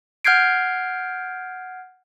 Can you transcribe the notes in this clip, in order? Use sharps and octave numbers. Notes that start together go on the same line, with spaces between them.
F#5 F6 G6 G#6 C7 D7